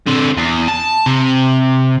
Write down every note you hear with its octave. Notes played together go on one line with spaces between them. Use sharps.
D3 C4
E2
A5
C3